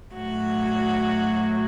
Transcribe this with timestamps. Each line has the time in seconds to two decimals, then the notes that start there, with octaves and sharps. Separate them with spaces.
0.15 A2 F#3 F#4